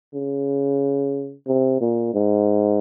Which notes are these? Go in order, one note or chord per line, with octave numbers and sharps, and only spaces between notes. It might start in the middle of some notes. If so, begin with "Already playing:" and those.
C#3
C3
A#2
G#2